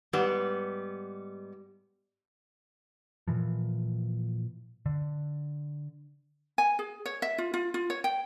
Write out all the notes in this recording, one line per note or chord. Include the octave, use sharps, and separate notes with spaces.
G#2 G3 B3
A#2 E3 F3
D3
G#5
G#4
C#5
E5
F4
F4
F4
C#5
G5